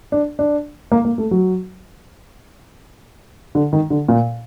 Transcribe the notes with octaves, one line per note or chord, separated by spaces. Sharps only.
D4
D4
A#3
A#3
A3
F#3
D3
D#3
D3
A#2